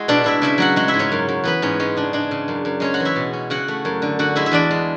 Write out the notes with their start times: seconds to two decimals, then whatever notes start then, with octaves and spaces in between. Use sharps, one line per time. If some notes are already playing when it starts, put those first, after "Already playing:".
Already playing: G#3 E4 F#4
0.08 B2 D4 D5
0.24 B2 E4 E5
0.42 C#3 E4 E5
0.58 F#3 F#4 F#5
0.76 G#3 F#4 F#5
0.88 E4 E5
0.94 G#2
0.99 C#4 C#5
1.12 F#2
1.29 F#2
1.44 E3 B3 B4
1.62 G#2 C#4
1.79 G#3 C#4
1.97 C#3 D4
2.13 G#3 D4
2.31 C#3
2.48 F#2
2.65 F#2
2.80 G#3 C#4 C#5
2.94 F#4 F#5
3.00 E3
3.05 E4 E5
3.16 B2
3.33 C#4
3.50 C#3 F#4 F#5
3.68 A3
3.85 F#2
4.02 D3
4.19 D3 F#4 F#5
4.36 G#3 E4 E5
4.46 E5
4.52 E2 D4 D5
4.71 G#3